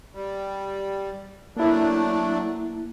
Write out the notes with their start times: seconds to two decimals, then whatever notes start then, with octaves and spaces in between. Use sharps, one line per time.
0.14 G3
1.57 F#3 A3 A#3 D4 E4